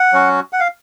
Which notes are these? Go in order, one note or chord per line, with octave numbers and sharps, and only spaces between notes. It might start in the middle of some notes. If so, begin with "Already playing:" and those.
Already playing: F#5
F#3 C#4 F#4
F#5
F5